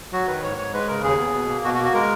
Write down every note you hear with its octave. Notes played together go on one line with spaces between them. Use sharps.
F#3 F#4
D#3 B4
G#2 C#5
G#2 C#5
G#3 B4
C#3 A#4
D#2 G#4
B3
B2
A#3
B2 F#4
F#4
A#3
F#4
G#3 A#4